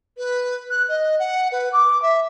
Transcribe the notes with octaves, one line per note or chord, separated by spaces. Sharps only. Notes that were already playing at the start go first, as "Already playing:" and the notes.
B4
F#6
D#5
F#5
B4
D6
E5